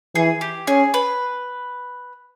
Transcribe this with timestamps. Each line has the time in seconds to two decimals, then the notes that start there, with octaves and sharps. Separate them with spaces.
0.15 E3 G#4
0.41 G4
0.67 C#4 G#4
0.94 B4